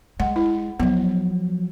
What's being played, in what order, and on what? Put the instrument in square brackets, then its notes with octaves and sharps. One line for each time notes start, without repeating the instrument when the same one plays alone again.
[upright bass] G#3 [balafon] F#5
[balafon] E4
[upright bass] F3 F#3 [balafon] B3